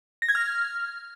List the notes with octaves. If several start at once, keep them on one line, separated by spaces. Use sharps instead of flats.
A#6
G#6
F6